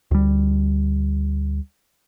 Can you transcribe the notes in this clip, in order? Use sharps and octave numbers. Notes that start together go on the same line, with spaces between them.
D2 G3